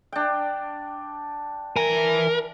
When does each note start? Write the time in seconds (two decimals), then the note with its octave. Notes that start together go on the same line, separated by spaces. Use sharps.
0.12 D4 G5
1.76 E3 A#4 G#5